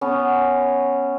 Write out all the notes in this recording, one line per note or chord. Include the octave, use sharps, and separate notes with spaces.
B3 C#4